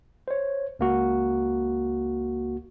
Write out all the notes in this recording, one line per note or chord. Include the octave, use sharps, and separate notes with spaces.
C5 C#5
C#2 A#3 F#4